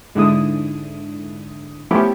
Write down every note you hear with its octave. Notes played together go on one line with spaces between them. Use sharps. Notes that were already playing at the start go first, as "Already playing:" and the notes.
G#2 D3 E4 D#6
F3 A3 B3 C#4 E4 G4